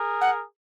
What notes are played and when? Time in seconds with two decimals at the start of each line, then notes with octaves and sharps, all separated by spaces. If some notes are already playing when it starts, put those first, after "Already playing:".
Already playing: G#4 A#4
0.21 F#5